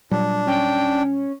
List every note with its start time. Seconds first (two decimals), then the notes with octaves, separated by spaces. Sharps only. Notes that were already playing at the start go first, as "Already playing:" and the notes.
0.11 A#2 F#3 G3 D4
0.47 C#4 G5